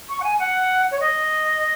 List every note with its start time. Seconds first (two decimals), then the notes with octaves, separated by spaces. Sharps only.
0.09 C#6
0.20 F#5
0.23 G#5
0.39 F#5
0.91 C#5
1.00 D#5